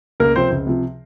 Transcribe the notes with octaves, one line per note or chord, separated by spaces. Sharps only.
C#2 A#3 A#4
C3 F3 C4 C5
C#2
C3 F3